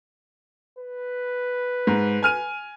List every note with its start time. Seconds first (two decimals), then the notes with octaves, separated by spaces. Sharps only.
0.78 B4
1.87 G#2
2.23 G#5 F6 D#7